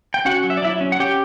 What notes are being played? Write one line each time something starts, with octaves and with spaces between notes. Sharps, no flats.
G5
C#4 F#4 F#5
F#3
E5
D5
F#3 E4 E5
C#4
F#5
C#4 G4 G5